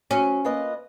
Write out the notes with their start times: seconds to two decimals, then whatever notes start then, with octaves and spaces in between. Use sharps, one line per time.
0.11 F#3 C#4
0.45 A#3 F4 B4 D#5